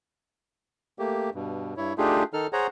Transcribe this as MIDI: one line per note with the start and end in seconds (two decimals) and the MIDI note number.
0.99 1.30 57
0.99 1.30 58
0.99 1.30 67
1.35 1.74 43
1.35 1.74 47
1.77 1.93 43
1.77 1.93 64
1.77 1.93 73
1.98 2.23 57
1.98 2.23 62
1.98 2.23 63
1.98 2.23 65
1.98 2.23 67
1.98 2.23 68
2.33 2.47 51
2.33 2.47 63
2.33 2.47 69
2.33 2.47 89
2.53 2.67 68
2.53 2.67 72
2.53 2.67 73
2.53 2.67 78
2.53 2.67 82